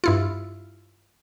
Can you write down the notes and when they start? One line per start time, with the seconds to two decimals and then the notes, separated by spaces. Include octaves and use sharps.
0.04 G2 E4 F4